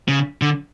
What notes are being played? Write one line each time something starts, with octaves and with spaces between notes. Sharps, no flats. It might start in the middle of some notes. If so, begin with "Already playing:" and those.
C#3
D3